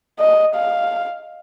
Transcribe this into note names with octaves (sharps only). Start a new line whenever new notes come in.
D#5
F5